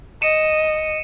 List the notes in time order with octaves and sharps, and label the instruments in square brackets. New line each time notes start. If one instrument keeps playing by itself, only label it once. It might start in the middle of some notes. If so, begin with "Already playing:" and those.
[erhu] D#5 [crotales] C#7 D#7 E7